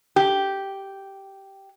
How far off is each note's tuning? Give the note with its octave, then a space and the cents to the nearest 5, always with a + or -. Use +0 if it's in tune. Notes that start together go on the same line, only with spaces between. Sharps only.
G4 -5